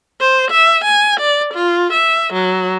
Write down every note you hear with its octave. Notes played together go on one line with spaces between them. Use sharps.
C5
E5
G#5
D5
F4
E5
F#3